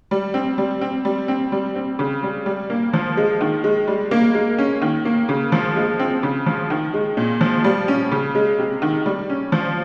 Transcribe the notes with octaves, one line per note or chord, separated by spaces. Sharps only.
G3
C4
G3
C4
G3
C4
G3
C4
C#3
G3
G3
A#3
F3
G#3
D#3
G#3
G3
A#3
G#3
C#4
D#3
A#3
C#3
F3
G#3
C4
C#3
F3
D#3
G#3
A#2
F3
G3
C#4
C#3
G#3
C3
D#3
G3
C#4
F3